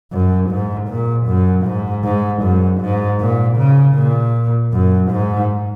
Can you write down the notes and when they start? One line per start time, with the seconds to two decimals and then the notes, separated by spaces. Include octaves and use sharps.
0.12 F#2
0.50 G#2
0.89 A#2
1.27 F#2
1.65 G#2
2.04 G#2
2.43 F#2
2.81 G#2
3.20 A#2
3.58 C#3
3.96 A#2
4.73 F#2
5.11 G#2